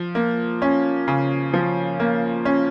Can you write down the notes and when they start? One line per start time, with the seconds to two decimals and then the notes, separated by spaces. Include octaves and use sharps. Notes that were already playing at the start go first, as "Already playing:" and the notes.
Already playing: F3
0.15 A#3
0.62 C#4
1.08 C#3
1.53 F3
2.00 A#3
2.45 C#4